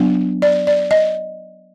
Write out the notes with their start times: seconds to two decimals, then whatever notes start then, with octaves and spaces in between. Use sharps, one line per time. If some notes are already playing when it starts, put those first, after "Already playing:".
Already playing: F#3 B3 D4
0.42 D5
0.67 D5
0.91 D#5